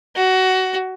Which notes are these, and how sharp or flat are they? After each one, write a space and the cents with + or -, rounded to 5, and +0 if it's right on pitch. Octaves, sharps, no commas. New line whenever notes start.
F#4 +20